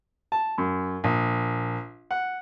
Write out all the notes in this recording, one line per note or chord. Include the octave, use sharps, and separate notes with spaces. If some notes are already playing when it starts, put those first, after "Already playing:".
A5
F#2
A#1
F#5